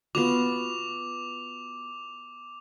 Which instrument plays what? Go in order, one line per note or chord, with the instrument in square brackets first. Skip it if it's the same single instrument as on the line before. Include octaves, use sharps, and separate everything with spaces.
[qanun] B3 F4 F#4 [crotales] D6 F7